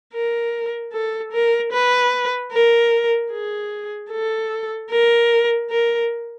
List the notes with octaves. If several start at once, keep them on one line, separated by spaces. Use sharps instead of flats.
A#4
A4
A#4
B4
A#4
G#4
A4
A#4
A#4